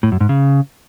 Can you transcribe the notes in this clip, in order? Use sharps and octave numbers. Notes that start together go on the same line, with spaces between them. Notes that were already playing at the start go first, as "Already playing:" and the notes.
A2
F#2
G#2
C#3